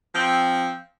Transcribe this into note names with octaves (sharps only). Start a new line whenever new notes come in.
F3 C4